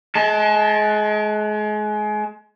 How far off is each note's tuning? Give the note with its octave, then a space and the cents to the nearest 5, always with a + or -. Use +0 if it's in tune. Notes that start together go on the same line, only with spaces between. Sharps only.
G#3 +30 A5 +0